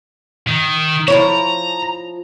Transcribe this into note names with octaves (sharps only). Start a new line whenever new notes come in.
D#3
F3 E4 C#5 A#5